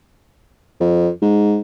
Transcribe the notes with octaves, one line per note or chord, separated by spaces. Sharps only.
F2
G#2